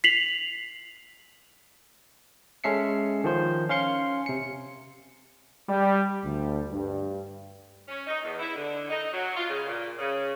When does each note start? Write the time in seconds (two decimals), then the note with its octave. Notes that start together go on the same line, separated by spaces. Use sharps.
0.04 B6 C7 F7 F#7
2.64 G#3 C#4 A4 E5 C7 C#7
3.24 D#3 F3 C5
3.69 C#4 F5 C6 C#7
4.26 C3 C#7
5.68 G3
6.23 D2
6.72 G2
7.88 C#4
8.07 D#4
8.24 E2
8.39 E4
8.55 D3
8.90 D#4
9.13 F#3
9.37 F4
9.48 C#3
9.67 A#2
9.99 C#3